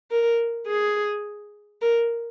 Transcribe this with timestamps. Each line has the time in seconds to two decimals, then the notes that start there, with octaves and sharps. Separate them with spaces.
0.11 A#4
0.67 G#4
1.81 A#4